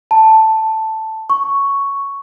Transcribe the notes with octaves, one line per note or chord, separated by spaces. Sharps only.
A5
C#6